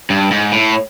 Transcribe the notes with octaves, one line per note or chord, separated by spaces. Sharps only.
G2
G#2
A2